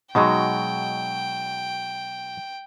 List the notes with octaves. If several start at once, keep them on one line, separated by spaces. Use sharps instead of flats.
B2 F#3 G#3 D#4 F#4 G5